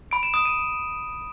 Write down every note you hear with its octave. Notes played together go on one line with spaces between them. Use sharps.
B5 D7
E7
D#6 E7
D#7